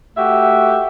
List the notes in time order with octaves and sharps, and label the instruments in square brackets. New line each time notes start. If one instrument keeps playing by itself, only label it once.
[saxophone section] A3 F#4 G4 E5